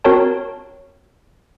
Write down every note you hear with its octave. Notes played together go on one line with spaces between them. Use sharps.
C4 F#4 A#4 C#5 A5